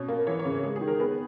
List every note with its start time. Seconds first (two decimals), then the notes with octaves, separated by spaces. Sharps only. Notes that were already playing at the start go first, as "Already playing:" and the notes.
Already playing: B2 C#4
0.08 A#3
0.27 E3 C#5
0.39 C#5
0.45 C#3
0.63 G#3 G#4
0.76 G#4
0.81 D#3
0.88 A#4
1.00 B3 G#4